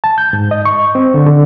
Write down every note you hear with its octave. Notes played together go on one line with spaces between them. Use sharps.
A5
G6
G#2
D#5
C#6
C4
D3
D3